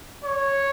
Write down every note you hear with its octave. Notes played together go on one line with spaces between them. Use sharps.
C#5